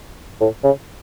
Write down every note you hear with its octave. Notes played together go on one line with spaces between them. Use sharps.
A2
C#3